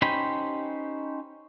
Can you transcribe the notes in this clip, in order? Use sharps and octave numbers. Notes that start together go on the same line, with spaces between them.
C#4 D#4 G4 C5 B5